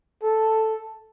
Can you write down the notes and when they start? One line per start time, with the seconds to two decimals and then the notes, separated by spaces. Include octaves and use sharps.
0.23 A4